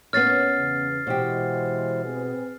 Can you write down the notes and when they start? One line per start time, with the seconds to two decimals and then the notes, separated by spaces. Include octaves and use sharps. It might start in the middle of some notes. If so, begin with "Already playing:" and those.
0.13 A#2 B3 C#4 C#5 F6 A6 C7
0.57 E2 C#3
1.07 B2 E3 G#3 G4 C5
2.04 C4 G#4 B4